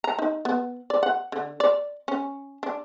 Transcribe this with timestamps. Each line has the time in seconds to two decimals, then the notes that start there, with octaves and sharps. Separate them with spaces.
0.04 A#5
0.19 D#4
0.45 B3
0.90 D5
1.03 F#5
1.32 D3
1.60 D5
2.08 C#4
2.63 D4